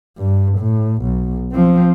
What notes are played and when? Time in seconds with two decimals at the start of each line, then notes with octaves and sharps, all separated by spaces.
0.18 G2
0.58 A2
1.03 B1
1.52 F3 C4